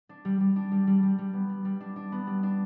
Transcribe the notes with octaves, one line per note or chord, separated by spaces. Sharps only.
D4
G3
G3
D4
G3
G3
G3
G3
B3
G3
G3
D4
D4
B3
G3
D4